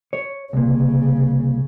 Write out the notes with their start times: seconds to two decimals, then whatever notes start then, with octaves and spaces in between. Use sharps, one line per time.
0.13 C#5
0.53 C2 A#2 C#3